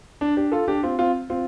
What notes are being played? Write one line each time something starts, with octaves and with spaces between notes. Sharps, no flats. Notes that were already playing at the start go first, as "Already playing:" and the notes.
D4
D4 G4
F4 A4
D4 G4
C4 F4
C4 F4
C4 F4